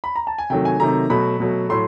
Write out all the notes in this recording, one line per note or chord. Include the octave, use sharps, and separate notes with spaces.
B5
A#5
A5
G#5
C3 D#3 F#3 A3 G5
G#5
C3 D#3 F#3 A3 A#5
B2 F#3 A3 B5
B2 F#3 A3
A2 F#3 A3 C6